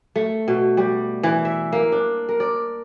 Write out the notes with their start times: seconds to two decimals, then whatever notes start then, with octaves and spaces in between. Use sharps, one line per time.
0.16 A3
0.48 B2
0.77 G3
1.23 E3
1.45 E5
1.72 A#3
1.92 D4
2.29 A#4
2.40 D5